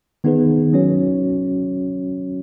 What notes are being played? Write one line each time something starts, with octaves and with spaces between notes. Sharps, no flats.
D#3 B3 D#4 G#4 B4
F#3 C#4 F#4 C#5